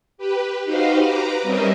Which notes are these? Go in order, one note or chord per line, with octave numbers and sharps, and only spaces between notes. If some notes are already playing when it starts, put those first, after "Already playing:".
G4 B4
D#4 F#4 G4 B4 C5 F5
B4 A#5 D6
G3 C4 C#4 A#4 D#5 E5